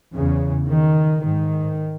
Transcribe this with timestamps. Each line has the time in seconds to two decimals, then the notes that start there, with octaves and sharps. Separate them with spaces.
0.13 E2 C#3
0.69 D#3
1.23 G#2 D#3